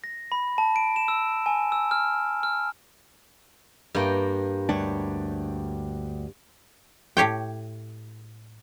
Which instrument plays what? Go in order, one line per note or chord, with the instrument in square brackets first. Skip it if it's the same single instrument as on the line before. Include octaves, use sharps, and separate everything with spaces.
[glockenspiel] A#6
B5
A5
D7
E7
E6
G#5
E6
F6
F6
[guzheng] G2 A#3 G5
[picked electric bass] D2 G3 D4 [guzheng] C#5
[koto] A2 G4 C#5 G5